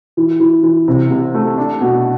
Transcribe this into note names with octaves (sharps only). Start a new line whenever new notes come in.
E3
E3
E3
C3
C2
A3
D4
B2